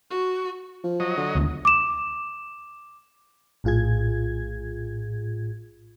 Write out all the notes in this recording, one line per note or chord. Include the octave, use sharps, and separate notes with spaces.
F#4
F3
F#3 D#5
D3
E1 D2
D6 E7
A#1 A2 F4 G#4 G#6